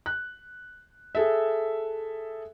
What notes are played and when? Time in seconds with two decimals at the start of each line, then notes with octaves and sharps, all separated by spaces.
0.06 F#6
1.15 G#4 A4 E5